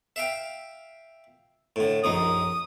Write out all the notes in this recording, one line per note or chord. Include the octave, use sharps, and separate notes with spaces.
E5 F5 G5
A2 D3
A#1 F#2 D#4 D#6